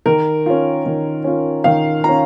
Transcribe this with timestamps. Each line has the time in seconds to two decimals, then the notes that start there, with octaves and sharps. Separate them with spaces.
0.06 D#3 A#4
0.46 C#4 F4
0.86 D#3
1.24 C#4 F4
1.64 D#3 F5
2.04 C#4 F4 A#5